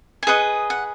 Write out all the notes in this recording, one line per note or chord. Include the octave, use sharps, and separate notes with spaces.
G#5
G#4 B4 D#5 F#5
F#5